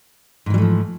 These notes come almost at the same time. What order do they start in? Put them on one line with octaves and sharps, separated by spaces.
G#2 E3 G3 A3 F3